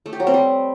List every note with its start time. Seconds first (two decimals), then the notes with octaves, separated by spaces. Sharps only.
0.06 A3
0.13 G4
0.20 F#3
0.27 C4
0.34 G3